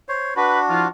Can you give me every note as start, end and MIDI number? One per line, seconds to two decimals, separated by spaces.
0.09 0.34 72
0.09 0.34 73
0.36 0.88 62
0.36 0.88 66
0.36 0.59 71
0.68 0.85 53
0.68 0.85 64
0.68 0.85 65